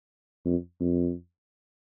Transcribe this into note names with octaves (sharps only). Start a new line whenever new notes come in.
F2
F2